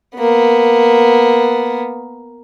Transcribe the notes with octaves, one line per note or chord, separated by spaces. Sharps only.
A#3 B3